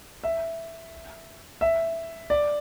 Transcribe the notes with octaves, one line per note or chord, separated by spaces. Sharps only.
E5
E5
D5